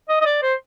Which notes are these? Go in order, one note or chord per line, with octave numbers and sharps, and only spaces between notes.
D#5
D#5
D5
C5